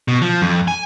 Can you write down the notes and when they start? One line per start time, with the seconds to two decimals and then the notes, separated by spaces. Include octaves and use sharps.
0.08 B2
0.22 F3
0.42 F2
0.68 G#5